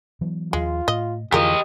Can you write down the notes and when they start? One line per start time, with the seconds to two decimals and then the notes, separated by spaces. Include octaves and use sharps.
0.21 E3 F#3 B3
0.53 D#2 F3 G#3 F4
0.88 A2 D#5
1.32 F2 D3 E3 G#3 F4 G4 A#4 D#5